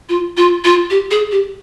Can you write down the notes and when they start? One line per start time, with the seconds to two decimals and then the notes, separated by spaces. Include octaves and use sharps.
0.09 F4
0.37 F4
0.64 F4
0.90 G4
1.11 G#4
1.31 G4